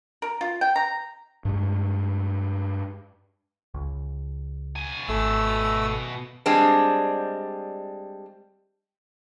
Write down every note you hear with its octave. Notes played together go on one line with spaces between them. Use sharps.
A#4
F4
G5
A#5
G2 G#3
C#2
B2 G#5
G#1 A3 E6
G3 G#3 C4 D4